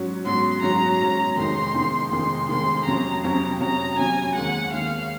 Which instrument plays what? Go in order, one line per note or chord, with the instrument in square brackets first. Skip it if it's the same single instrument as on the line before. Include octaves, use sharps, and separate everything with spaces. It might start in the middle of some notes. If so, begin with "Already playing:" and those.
Already playing: [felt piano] G#2 F#3 C#4 F#4
[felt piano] G#2 F#3 C#4 F#4 [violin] C6
[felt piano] G#2 F#3 C#4 F#4 [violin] A#5
[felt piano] G#2 F#3 C#4 F#4
[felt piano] F1 F2 D#3 G#3 D#4 [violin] C6
[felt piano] F1 F2 D#3 G#3 D#4
[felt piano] F1 F2 D#3 G#3 D#4 [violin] C6
[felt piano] F1 F2 D#3 G#3 D#4 [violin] C6
[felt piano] F2 C3 F#3 C#4 [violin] A#5
[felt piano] F2 C3 F#3 C#4 [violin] A#5
[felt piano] F2 C3 F#3 C#4 [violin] A#5
[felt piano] F2 C3 F#3 C#4 [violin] G#5
[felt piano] D#2 D#3 G#3 [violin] F#5
[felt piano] D#2 D#3 G#3 [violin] F5